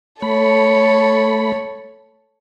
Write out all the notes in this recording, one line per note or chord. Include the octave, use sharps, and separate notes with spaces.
A3 A4 C#5 B5